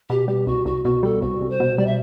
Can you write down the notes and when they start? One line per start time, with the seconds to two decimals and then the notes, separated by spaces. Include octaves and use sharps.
0.10 B2 G4
0.28 G3 G4
0.47 C2 F#4
0.65 C2 F#4
0.84 B2 F#4
1.03 G3 A4
1.22 C2 F#4
1.41 C2
1.50 C5
1.60 B2
1.78 G3 D5
1.86 E5